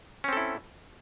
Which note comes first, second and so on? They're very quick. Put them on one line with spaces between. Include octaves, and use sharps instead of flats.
C#4 C4 A4 E4